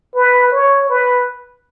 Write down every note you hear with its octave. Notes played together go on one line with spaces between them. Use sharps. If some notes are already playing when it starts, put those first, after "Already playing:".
B4
C#5
B4